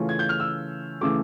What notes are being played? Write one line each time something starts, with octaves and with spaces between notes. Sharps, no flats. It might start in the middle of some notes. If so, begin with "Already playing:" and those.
Already playing: C#3 E3 A3 C#4 F4
G#6
G6
F6
E6
C#3 E3 A3 D6